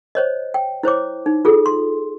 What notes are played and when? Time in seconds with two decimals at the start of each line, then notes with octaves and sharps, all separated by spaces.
0.15 C5 C#5 D#5
0.54 G5
0.83 E4 C5 C#5 D6
1.26 D#4
1.45 F4 G#4 A4
1.66 C6